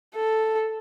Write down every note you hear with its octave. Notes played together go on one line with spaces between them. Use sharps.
A4